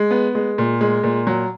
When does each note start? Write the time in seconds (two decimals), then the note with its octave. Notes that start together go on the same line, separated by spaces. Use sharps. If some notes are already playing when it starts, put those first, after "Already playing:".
Already playing: G#3
0.11 B3
0.35 G#3
0.58 A#2
0.81 G#3
1.04 A#2
1.27 F#3